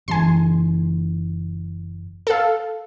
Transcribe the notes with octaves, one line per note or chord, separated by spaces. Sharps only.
F#1 E3 G#5 C6
A4 F5